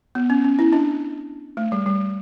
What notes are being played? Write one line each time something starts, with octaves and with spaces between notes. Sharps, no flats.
B3
C#4
C#4
E4
D4
A3
G3
G3